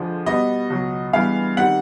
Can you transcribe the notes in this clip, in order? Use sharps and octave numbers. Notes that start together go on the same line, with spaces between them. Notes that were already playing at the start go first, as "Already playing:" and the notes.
Already playing: F2 D3 F3 G#3
B2 G3 B3 D#5
C#2 B2 F#3
G2 E3 G#3 B3 F5
D#3 G3 C4 F#5